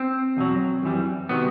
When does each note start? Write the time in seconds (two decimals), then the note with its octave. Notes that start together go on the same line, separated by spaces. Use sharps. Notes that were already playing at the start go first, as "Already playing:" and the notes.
Already playing: C4
0.37 E2 B2 F#3
0.82 F#2 E3 G3
1.29 C3 D#3 F#3 B3